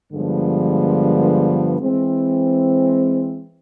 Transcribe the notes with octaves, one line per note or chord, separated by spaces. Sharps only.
G2 D3 F3 G#3 B3
E3 G#3 C4